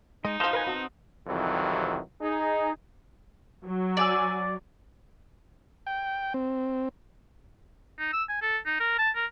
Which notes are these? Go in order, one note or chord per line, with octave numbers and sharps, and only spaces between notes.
G#3 D#4 D#5
F3 F#3 A4 C5 F5 D#6 A#6
A#4 B4 F5 G#5
C4 F#4 A5 D#6
C2 F2 C3 D#3 E3 F#3
D#4 G#4
F#3
D5 F#5 G#5 E6
G5
C4
D#4
E6
G#5
A4
D#4
A#4
A5
A#4